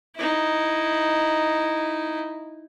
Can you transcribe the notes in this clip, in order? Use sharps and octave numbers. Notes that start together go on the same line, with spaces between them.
D#4 E4